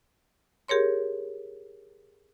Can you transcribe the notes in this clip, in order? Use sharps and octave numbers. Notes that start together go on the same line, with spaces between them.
G4 G#4 A#4 C#5 C6